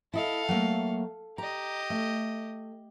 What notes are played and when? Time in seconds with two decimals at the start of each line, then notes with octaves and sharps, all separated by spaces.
0.13 E4 A4 D#5 F5
0.49 F#3 A3 A#3
1.38 G4 D#5 A#5
1.90 A3